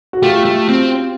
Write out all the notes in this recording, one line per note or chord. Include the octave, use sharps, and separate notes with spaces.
F#4
A3 F4 G4
A3
C4